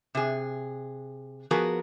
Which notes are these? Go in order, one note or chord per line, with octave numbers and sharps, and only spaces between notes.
C3 G#4
F3 B3 F#4 G#4 A#4